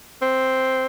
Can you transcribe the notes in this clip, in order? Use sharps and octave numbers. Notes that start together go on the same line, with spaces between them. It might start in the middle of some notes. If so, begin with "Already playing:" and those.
C4